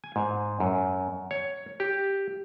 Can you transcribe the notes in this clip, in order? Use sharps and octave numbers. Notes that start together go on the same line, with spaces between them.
G#5
G#2
F#2
C#5
G4